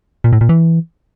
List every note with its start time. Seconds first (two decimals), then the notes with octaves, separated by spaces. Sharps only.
0.24 A#2
0.33 A2
0.41 A#2
0.49 E3